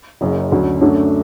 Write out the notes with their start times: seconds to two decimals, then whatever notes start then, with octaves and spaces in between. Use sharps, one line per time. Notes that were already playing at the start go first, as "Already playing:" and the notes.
0.21 F#1 F#2 C#3
0.52 D2 D3 F#3 C#4
0.81 F#2 D3 F#3 A3 D4